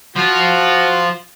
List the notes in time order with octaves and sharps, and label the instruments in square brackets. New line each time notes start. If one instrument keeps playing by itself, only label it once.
[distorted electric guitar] F3 F4 [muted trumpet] F#4